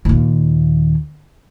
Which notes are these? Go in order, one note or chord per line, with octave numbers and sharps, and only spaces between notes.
D#2 A#2